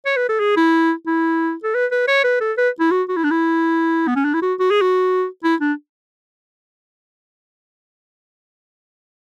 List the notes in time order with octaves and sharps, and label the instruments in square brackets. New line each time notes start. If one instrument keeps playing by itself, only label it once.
[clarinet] C#5
B4
A4
G#4
E4
E4
A4
B4
B4
C#5
B4
A4
B4
E4
F#4
F#4
E4
D4
E4
B3
C#4
D4
E4
F#4
F#4
G#4
F#4
E4
D4